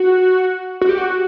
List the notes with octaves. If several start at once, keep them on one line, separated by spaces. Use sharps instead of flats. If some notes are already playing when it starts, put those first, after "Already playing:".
Already playing: F#4
F#4
G4
F#4